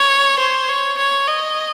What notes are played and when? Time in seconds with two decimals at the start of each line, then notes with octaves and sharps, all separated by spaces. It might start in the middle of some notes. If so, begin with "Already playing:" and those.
Already playing: C#5
0.39 C5
0.69 C#5
0.98 C#5
1.27 D#5